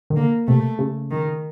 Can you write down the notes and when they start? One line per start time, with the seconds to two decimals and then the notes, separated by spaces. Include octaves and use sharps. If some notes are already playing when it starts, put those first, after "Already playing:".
0.10 D#3
0.16 D3 A#3
0.47 C3 A3
0.79 C#3
1.11 D#3